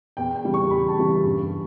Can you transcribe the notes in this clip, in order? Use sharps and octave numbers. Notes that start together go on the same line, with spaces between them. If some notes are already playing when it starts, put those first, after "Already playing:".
E2 G5
G5
C#3 E3 G3
C#6
E2 B5
A5
C#3 E3 G3
G2